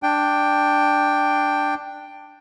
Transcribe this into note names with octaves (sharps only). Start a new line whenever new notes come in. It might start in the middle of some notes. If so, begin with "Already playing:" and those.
D4 G5